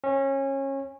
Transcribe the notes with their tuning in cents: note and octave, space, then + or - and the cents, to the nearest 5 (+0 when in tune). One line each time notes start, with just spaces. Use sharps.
C#4 -25